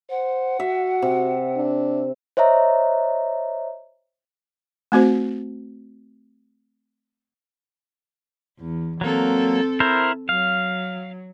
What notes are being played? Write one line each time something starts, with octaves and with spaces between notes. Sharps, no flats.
C5 F#5
F#4 E5
C3
D4
C5 C#5 D#5 E5 A#5
A3 C4 F#4 C5
E2
F#3 A#3 C4 A4
E4 A#4 C5
F#3 F5